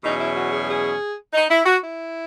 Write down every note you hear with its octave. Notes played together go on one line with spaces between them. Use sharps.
E2 B2 F#3 C#4 D#4
E4
F#4
G#4
G#4
D#4
E4
F#4
E4